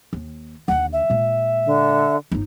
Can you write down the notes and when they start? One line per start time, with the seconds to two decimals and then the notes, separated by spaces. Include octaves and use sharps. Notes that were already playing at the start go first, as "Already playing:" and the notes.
0.13 D#2
0.68 D#2 D3 F#5
0.93 E5
1.10 A#2 G#3
1.65 D3
2.32 G1 D#4